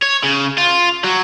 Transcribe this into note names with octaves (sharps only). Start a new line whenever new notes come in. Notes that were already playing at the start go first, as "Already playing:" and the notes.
C#5
C#3
F4
F#3